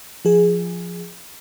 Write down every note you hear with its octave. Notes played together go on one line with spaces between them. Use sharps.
F3 G#4